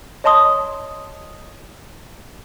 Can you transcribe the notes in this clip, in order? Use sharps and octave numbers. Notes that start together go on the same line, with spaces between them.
C#5 D#5 A5 C6 D#6